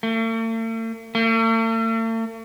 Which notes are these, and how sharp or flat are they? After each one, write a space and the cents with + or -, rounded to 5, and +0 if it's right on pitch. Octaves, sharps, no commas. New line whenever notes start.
A3 +45
A3 +45